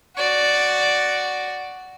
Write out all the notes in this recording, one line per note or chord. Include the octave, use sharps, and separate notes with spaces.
F#4 D5